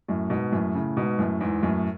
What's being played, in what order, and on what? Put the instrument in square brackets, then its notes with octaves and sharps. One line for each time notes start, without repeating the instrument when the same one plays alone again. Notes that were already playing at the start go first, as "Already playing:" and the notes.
[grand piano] F#2 A2
G#2 B2
F#2 A2
A2 C#3
G#2 B2
F#2 A2
E2 G#2
F#2 A2